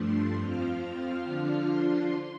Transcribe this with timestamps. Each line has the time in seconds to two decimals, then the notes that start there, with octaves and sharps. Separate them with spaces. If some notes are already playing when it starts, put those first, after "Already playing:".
Already playing: G2 F3 A3 D4 C6
0.37 F2 F3 C4 F4 F6
0.81 F6
1.23 D3 F3 D4 F4
1.66 C6